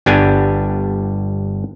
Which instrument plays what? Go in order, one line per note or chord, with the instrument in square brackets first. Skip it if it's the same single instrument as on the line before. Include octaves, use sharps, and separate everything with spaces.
[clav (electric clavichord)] G1 G3 B3 D4 G4 G#5